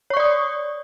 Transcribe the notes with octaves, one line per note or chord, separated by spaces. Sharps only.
C#5 D5 C#6 D#6